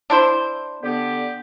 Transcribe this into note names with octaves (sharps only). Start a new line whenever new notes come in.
D4 E4 C5
D3 B3 G4